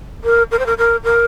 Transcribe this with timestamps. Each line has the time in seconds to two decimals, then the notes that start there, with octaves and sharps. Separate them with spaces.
0.24 A#4
0.51 A#4
0.59 C5
0.66 A#4
0.78 A#4
1.04 A#4